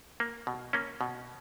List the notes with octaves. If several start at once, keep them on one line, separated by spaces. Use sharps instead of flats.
A#3
B2
A#3 C#4
B2